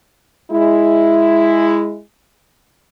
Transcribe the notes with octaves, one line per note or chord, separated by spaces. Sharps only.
G#3 E4